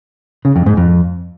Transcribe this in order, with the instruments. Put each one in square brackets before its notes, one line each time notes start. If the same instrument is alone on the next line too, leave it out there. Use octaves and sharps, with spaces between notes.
[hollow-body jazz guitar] C#3
F2
G#2
F2